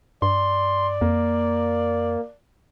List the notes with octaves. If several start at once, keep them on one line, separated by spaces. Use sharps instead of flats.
G2 D5 C6
F2 A#3